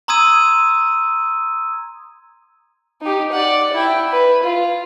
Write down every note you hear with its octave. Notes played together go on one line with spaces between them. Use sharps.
A#5 C6 D#6 E6 G#6 D#7
D#4 G4
D5 F#5
E4 G5
B4
F4